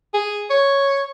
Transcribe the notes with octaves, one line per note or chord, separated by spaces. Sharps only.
G#4
C#5